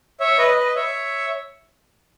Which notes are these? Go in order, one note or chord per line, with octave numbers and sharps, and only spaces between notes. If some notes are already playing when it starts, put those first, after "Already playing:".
C#5 E5
B4 D#5
B4 D#5
C#5 E5